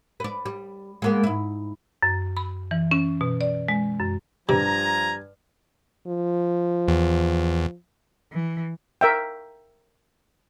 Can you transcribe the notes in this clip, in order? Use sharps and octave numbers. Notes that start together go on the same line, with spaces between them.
B4 D5
G3
G#3 A#3 B3
G#2 E4
F#2
B5
E3
C#4
B2
D5
G#3
F#2
G2 C3 F3 G#5 A#5
F3
E2
E3
A#4 E5 G5